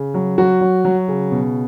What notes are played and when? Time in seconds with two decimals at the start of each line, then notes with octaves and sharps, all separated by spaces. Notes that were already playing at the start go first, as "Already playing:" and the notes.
Already playing: C#3
0.14 F#3
0.38 F#3 F#4
0.61 F#3
0.85 F#3
1.08 C#3
1.32 B2